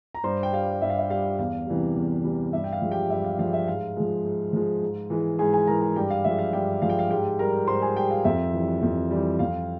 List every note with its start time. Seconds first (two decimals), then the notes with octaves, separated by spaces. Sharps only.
0.15 A#5
0.24 G2 C5 C6
0.43 G5
0.53 G3 F5
0.82 G2 E5
0.90 F5
0.98 E5
1.10 G3 F5
1.39 E2 F5
1.67 C3 E3 G3
1.96 E2
2.24 C3 E3 G3
2.53 G2 E5
2.64 G5
2.72 F5
2.81 F3 G#3
2.91 G4 G5
3.10 G2 E5
3.24 F5
3.39 F3 G#3 F5
3.53 E5
3.68 G#2 F5
3.96 F3 G#3
4.25 G#2
4.53 F3 G#3
4.82 G#2
5.10 E3 G#3
5.39 G#2 G#4 G#5
5.53 G#4 G#5
5.67 E3 G#3 A#4 A#5
5.82 G#4 G#5
5.96 G2 G4 G5
6.10 F5
6.24 F3 G#3 E5
6.39 F5
6.53 G2 G4 G5
6.82 F3 G#3 F5
6.90 G5
6.99 F5
7.11 G#2 G4 G5
7.39 G3 A#4 A#5
7.68 G#2 C5 C6
7.82 G#4 G#5
7.96 G3 G4 G5
8.11 F5
8.25 F2 E5
8.54 E3 G3
8.83 F2
9.11 E3 G3
9.39 F2 F5